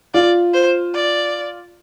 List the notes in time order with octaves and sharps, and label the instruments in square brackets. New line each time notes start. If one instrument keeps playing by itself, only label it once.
[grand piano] F4 [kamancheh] D5
[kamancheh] C5
D5